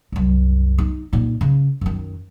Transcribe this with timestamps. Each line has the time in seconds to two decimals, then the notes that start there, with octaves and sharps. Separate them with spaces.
0.12 C2 F#2
0.78 D#4
1.13 A#2 D#4
1.41 C#3
1.81 F#2 D#3